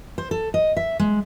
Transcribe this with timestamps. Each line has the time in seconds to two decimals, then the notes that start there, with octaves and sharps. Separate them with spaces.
0.18 C5
0.31 A4
0.54 D#5
0.77 E5
0.99 G#3